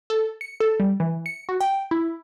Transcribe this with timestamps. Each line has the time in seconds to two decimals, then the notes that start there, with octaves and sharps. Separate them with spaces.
0.10 A4
0.41 C#7
0.60 A4
0.80 G3
1.00 E3
1.26 C#7
1.49 F#4
1.61 G5
1.91 E4